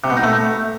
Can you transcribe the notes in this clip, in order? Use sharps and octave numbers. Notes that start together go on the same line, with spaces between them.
C3
B2
D#4
A3